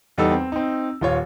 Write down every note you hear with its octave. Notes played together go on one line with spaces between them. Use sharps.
E2 G3 D#4 A4 E6
C4
C4 D#4
D#1 F4 C#5